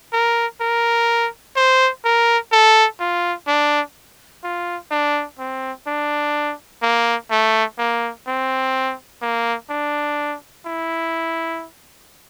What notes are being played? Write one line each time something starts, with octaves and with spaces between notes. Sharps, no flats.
A#4
A#4
C5
A#4
A4
F4
D4
F4
D4
C4
D4
A#3
A3
A#3
C4
A#3
D4
E4